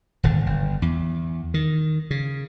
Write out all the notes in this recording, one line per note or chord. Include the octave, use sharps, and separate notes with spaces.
D#1 G#1 D3
G1
E2
D#3
C#3